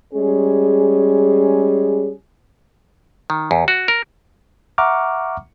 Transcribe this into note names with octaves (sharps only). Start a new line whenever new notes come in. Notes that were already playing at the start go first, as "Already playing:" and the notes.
G3 G#3 C#4 G#4
D#3
E2
F#4
A#4
E5 F#5 A#5 C#6 D6 F6